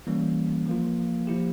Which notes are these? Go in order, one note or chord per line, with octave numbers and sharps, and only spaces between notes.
E3 G3 A#3 C#4
F3 A#3 F4
F3 A#3 E4 G4